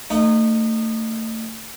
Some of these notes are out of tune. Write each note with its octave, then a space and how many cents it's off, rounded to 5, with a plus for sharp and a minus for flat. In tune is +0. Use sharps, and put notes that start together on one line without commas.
A3 +35 D#4 -25